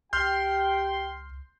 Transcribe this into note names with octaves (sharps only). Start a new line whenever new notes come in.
C#2 G4 G5 C6 F6 G6